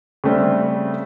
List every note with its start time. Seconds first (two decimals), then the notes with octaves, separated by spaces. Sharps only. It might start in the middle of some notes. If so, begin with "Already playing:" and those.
0.24 C#3 G3 A3 C4 D4